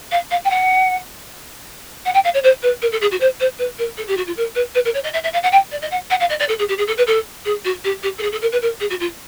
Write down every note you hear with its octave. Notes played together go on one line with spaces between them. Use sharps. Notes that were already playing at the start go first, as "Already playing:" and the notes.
F5
F5
G5
F#5
F#5
G5
F5
C#5
C5
B4
A#4
A4
G#4
F#4
C5
C5
B4
A#4
A4
G4
F#4
F4
A#4
B4
B4
A#4
C#5
D#5
E5
E5
F5
F#5
G5
D5
D#5
F#5
F#5
F5
D#5
D5
A4
G#4
G4
G#4
A4
B4
A4
G#4
F#4
G4
G4
A4
G#4
A4
A#4
B4
A#4
G#4
F#4
F4